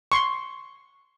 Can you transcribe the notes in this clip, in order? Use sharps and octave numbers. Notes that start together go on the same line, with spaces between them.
C6 C#6